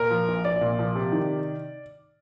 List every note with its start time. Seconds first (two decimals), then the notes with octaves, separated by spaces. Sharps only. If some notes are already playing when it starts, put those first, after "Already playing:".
Already playing: A#2 A#4
0.11 F3
0.28 A#1
0.45 A#1 D5
0.61 A#2
0.79 F3
0.95 C3
1.12 D#3